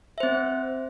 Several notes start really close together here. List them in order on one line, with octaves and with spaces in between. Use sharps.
E5 C5 C4